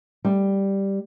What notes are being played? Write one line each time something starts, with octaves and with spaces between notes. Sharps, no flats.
G3